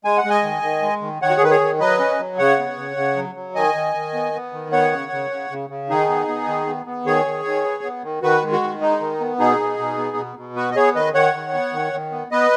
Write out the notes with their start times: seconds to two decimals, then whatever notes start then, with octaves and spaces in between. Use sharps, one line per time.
0.05 G#3 G#5
0.18 F#5
0.24 G#3
0.30 D#5 G#5
0.43 D#3
0.63 D#3
0.82 G#3
1.02 D#3
1.22 D#3 C#5 F#5
1.30 F#4
1.37 G#4
1.41 D#3 B4
1.51 G#4 C#5
1.60 D#3
1.80 F#3 B4 D#5
1.99 C#4
2.19 F#3
2.38 C#3 C#5 F#5
2.59 B3
2.77 C#3
2.97 C#3
3.16 F#3
3.35 F#3
3.55 D#3 D#5 G#5
3.75 D#3
3.95 D#3
4.14 B3
4.33 B3
4.53 D#3
4.72 B3 C#5 F#5
4.92 C#3
5.12 C#3
5.30 C#3
5.50 C#3
5.69 C#3
5.89 D#3 D#4 G#4
6.09 B3
6.28 B3
6.47 D#3
6.66 B3
6.86 B3
7.06 D#3 G#4 C#5
7.26 D#3
7.45 D#3
7.64 B3
7.84 B3
8.03 D#3
8.22 D#3 F#4 B4
8.43 G#3
8.52 F#4
8.62 D#3
8.81 G#3 D#4
9.00 D#3
9.20 B3
9.39 B2 D#4 G#4
9.60 B2
9.78 B2
9.97 B3
10.17 B2
10.37 B2
10.56 B3 F#4 B4
10.71 D#5
10.76 B3 G#4 C#5
10.95 D#3 B4 D#5
11.14 D#3 C#5 F#5
11.34 D#3
11.53 B3
11.73 D#3
11.93 D#3
12.12 B3
12.31 B3 B4 D#5